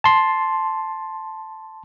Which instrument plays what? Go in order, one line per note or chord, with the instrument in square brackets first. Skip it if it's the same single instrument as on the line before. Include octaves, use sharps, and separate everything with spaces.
[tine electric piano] A5 C6